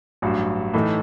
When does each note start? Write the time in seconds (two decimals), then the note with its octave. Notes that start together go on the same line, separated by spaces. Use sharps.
0.22 A1 G2 F#3
0.74 A2 E3 A3 D#4